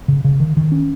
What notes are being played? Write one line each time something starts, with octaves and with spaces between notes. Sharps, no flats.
C#3
C#3
D#3
D#3
C#4